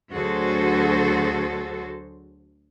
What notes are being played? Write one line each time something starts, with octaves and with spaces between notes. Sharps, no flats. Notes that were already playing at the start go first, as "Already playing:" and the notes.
D2 F#3 F#4 G#4 A4 C5